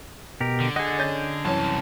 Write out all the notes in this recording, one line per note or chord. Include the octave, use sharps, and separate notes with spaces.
B2 G4 A#4
D3
G#4 D#5 F#5
C#4 G6 A6
C2 F#2 E3 C#4 A5